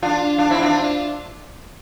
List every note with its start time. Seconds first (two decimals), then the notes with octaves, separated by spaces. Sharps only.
0.03 D4 F4
0.38 D4 F4
0.50 C4 E4
0.62 D4 F4